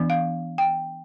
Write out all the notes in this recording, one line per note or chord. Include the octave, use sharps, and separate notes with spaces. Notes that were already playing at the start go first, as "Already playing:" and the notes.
Already playing: E3 B3 D4
F5
G5